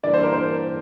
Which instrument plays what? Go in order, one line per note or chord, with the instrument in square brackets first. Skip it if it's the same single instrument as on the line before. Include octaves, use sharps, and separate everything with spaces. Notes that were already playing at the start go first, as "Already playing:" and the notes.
[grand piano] G2 E3 A#3 D4 [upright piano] D5
[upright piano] C5
A#4
C5